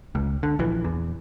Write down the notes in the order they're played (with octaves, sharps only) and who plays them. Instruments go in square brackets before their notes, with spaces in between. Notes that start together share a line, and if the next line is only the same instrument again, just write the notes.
[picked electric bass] C#2
D3
A#1 E3
E2